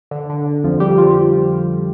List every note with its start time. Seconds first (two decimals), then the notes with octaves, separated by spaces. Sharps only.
0.11 D3
0.30 D3
0.46 D3
0.64 F2 F3
0.80 G3 G4
0.98 F3 F4